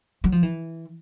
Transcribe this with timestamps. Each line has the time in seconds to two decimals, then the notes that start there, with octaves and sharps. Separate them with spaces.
0.24 F#3
0.32 F3
0.43 E3